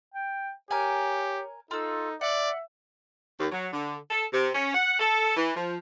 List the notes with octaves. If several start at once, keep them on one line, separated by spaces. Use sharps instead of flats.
G5
G4 A#4 C#5 G#5
D#4 F4 A4 E6
D5 E5 F#5
D#2
F#3
D3
A4
C3
C#4
F#5
A4
E3
F3